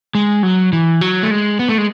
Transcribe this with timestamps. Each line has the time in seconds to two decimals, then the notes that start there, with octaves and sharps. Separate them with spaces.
0.15 G#3
0.43 F#3
0.73 E3
1.01 F#3
1.23 A3
1.31 G#3
1.59 B3
1.69 A3
1.78 G#3